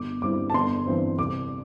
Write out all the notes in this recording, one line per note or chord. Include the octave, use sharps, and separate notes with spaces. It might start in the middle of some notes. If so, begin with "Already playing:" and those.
Already playing: G1 D6
G2 G3 C4 E4 D6
A5
G1 C6
G2 E3 C4
C2 D6